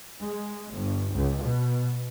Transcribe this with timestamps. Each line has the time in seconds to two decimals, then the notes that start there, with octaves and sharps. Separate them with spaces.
0.23 G#3
0.76 G1
1.15 C#2
1.44 B2